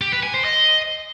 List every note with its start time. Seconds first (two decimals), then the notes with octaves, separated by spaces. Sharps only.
0.01 G4
0.12 B4
0.23 G#5
0.34 C5
0.45 D#5